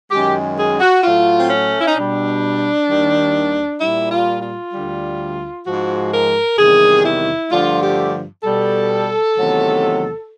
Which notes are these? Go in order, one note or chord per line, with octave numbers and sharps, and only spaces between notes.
F#2 D#3 G#3 G4
G#4
F#4
A2 F#3 A3 F4
C4
C#4
E4
D#4
B2 G3 D4
D#2 D#3 G3
A#2 G3 E4
F4
F4
D2 D3 G3
G#2 F3 G#3 F#4
A#4
E2 C3 D#3 G3 G#4
E4
G2 D3 F3 A3 F4
G4
B2 G3 A4
E2 C3 D#3 F#3 A3